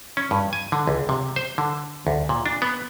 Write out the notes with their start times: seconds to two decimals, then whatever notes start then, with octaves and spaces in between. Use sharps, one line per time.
0.17 C#4
0.31 G2
0.53 G#5
0.72 D3
0.88 C#2
1.09 C3
1.36 C5
1.58 D3
2.07 D2
2.29 A#2
2.46 D4
2.62 B3